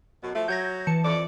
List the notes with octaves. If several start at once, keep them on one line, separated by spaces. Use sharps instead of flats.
F#2 B2
F3 A3
F#3 G6 G#6 A#6
E3 A5 C#7
F2 D5